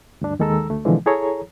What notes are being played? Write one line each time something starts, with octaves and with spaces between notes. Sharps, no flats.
D2 G2 D4
D#2 D#3 G#3 A4 A#5 E6
D2 A3
B2 D3 E3 F3 G#3
E4 G#4 A4 C#5 A#5